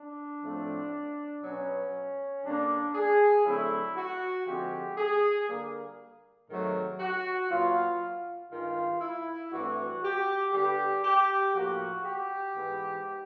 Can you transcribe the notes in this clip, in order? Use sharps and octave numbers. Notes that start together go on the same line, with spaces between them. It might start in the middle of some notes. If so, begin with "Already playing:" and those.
Already playing: D4
A2 F3 A3 C4
B2 F#3 B3 C#4
D3 G3 A#3 D4
G#4
D3 F#3 A3 C4 E4
F#4
D3 F3 G#3 C4 G4
G#4
D3 G3 A#3
G#2 D#3 F#3 A3 C4
F#4
A#2 F#3 B3 F4
G2 D#3 G#3 F4
E4
G2 E3 A3 C4 F#4
G4
D3 G3 B3 G4
G4
A2 F3 A#3 F#4
G4
G#2 E3 G#3 B3